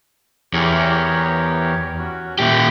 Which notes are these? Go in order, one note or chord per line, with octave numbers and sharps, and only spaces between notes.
E2 G4 A#4 C#5
C#4 F#4
A#2 E4 G4